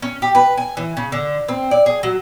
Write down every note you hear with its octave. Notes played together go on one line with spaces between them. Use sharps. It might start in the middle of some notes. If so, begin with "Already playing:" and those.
C#4
G4
B4
G#5
E3
C#3
D3
C4
D5
G#4
F#3